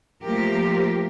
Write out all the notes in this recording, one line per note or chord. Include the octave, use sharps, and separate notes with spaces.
F3 A3 A#3 G4 A#4